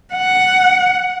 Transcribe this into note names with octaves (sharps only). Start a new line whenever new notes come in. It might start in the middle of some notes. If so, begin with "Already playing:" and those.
F#5